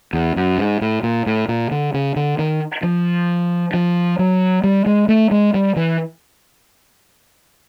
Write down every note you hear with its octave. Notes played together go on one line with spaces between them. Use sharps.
E2
F#2
G#2
A2
A#2
A2
A#2
D3
C#3
D3
D#3
F3
F3
F#3
G3
G#3
A3
G#3
G3
E3